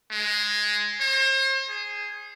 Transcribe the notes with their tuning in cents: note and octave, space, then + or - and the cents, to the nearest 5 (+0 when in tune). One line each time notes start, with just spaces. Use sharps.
G#3 +5
C5 +40
G#4 +0